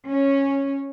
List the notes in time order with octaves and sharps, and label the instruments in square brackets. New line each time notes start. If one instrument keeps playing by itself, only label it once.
[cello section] C#4